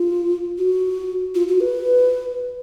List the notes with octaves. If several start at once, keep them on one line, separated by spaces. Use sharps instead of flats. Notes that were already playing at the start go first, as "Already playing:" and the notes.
Already playing: F4
F#4
F4
F#4
B4